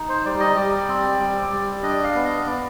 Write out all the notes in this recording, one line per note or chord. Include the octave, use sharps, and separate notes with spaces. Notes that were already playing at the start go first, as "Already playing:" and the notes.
Already playing: D#4
C5
G3 D5
D#5
G3 D5
C4
G3
G3
D4 D#5
F5
B3
D#5
B3 D5